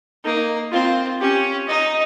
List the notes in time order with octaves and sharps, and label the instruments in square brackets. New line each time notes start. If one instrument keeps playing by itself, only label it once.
[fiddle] A#3 [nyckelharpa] D#4
[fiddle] C4 [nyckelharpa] F4
[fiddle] C#4 [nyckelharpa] G4
[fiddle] D#4 [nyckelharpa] D#5